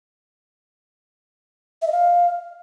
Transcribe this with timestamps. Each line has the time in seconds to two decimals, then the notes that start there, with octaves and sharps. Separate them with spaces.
1.82 E5
1.87 D#5
1.92 F5